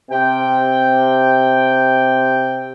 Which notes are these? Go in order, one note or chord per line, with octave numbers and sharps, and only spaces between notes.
C3 G5